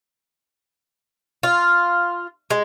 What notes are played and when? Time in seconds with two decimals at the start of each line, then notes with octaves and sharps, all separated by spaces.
1.43 F4
2.50 G#3